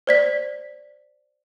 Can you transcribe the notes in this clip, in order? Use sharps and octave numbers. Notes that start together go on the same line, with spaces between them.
C5 D5 B6